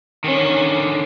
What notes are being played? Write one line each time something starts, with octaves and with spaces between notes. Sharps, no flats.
D3 D#3 C#4